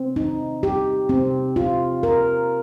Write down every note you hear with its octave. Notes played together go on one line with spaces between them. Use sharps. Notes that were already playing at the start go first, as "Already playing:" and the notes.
Already playing: C4
D#4
G4
C4
F4
A#4